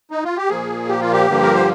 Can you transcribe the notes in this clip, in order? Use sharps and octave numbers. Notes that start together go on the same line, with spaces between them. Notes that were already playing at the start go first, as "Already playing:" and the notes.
D#4
F4
G4
A#2 F3 A#3 G#4
G4
F4
G4
G2 D3 F3 A#3
A#4
C5